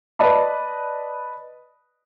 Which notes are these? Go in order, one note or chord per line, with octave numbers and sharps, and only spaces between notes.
B4 D5 D#5 A5 B5